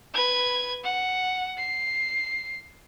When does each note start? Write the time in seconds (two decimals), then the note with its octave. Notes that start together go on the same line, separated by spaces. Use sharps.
0.14 B4 G#6
0.83 F#5
1.58 C7